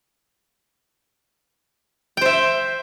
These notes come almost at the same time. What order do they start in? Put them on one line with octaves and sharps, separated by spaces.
G5 C5 E5